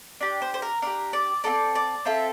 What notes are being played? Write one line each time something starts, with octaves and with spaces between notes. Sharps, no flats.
D4 G4 D5
C5
C5
A#4
D4 G4 A#4
D5
C4 F4 A4 D5
D5
C4 F4 A4 E5